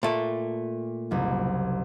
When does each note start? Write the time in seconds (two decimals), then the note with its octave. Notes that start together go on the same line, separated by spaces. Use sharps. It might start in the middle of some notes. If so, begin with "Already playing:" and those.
0.03 A#2 A3
1.11 F#1 C2